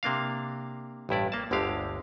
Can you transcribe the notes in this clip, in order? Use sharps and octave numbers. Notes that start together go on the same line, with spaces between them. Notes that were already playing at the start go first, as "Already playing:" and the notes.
C3 A#3 D4 F5
A1 G2 E4 D5
A#3 A5
G1 D2 D3 G#3 G4 F5